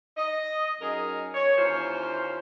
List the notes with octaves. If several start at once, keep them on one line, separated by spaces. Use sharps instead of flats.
D#5
F#2 D#4 G#4 A#4
C#5
D#2 E3 C#4 F4 C5